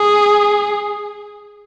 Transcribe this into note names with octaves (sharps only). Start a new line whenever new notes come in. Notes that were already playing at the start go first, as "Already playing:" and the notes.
Already playing: G#4